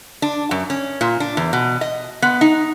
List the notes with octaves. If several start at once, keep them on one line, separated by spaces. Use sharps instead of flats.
D4
F#2
C#4
A#2
D4
E2
B2
D#5
B3
D#4